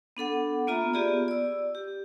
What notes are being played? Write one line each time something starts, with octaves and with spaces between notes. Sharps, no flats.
B3 D4 A4 F#5
A#3 B3 F4 E5 A#5
B3 F4 G4 G#4 D5
D5 E6
G4